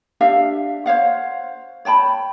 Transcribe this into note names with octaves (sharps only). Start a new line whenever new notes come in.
D4 G4 E5 F5
C5 C#5 F5 F#5
C#5 G5 A5 B5